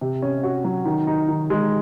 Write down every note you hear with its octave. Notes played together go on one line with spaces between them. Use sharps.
C3
C#4
F#4
F#3
D#3
D#4
D#3
G#3